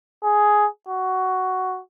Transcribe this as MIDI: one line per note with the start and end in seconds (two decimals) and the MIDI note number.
0.24 0.67 68
0.88 1.80 66